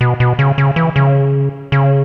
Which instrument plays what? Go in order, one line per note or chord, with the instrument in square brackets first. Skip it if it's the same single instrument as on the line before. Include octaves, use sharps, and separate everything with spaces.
[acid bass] B2
B2
C#3
C#3
E3
C#3
C#3